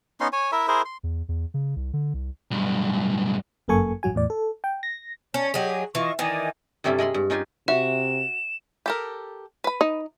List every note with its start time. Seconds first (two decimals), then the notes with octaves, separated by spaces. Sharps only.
0.20 B3 C#4 D#4 C6
0.33 C#5 G#5
0.52 E4 A#4 E5
0.68 E4 G#4 A#4 C5
0.85 C6
1.03 E2
1.29 E2
1.54 C#3
1.76 C2
1.93 D3
2.14 C2
2.51 B1 G2
3.68 G1 F#2 A#3 A4 G#5 C#6
4.03 A1 G2 F#3 F#4 G#5
4.15 E2 A2 D5
4.30 A4
4.64 G5
4.83 A#6
5.34 C#4 C#5 A5
5.54 F#3 G4 G#4 D#5
5.95 E3 F4 D#5 C#6
6.19 D#3 E3 D5 D#5 G#5
6.84 G2 C3 G3 C#4 E4 A4
6.98 G#3 D#5 B5 C6
7.14 G2
7.30 C#4 D#4 F4 G4 G#5
7.68 C3 F#4 E5 E7
8.86 G4 A4 A#4
9.64 B4 B5
9.81 D#4